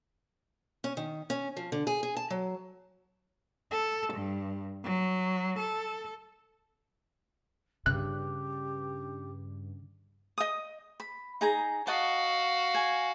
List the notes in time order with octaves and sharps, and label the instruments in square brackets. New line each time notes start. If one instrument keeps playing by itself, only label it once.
[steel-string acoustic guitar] C#4
D#3
C#4
F3
D3
G#4
G#4
A5
F#3
[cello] A4
G2
F#3
A4
[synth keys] G2 [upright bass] C#3 [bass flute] G4 [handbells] F#6
[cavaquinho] D#5 D#6
B5
D#4 G#4 A#5
[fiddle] F#4 F5 [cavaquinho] D#5 F#5 A5
[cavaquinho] G#5